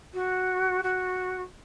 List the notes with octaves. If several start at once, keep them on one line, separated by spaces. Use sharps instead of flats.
F#4
F#4